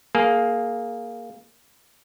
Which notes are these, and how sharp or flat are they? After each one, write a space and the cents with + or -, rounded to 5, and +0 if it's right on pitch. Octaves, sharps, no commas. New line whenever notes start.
A#3 +0 G#4 +15